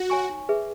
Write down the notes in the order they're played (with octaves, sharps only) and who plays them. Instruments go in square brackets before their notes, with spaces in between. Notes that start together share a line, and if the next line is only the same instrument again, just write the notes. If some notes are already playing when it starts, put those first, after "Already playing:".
Already playing: [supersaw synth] F#4
[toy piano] C#5 G#5 C#6
D#4
G#4 B4 E5